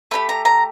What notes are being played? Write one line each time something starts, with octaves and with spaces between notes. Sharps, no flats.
A3 D4 G4 B5
A#5
A#5